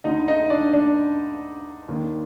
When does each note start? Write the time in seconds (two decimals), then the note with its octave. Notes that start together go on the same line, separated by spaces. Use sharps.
0.04 D2 D3 D#4 D#5
0.28 D#4 D#5
0.50 D4 D5
0.73 D4 D5
1.88 D#2 D#3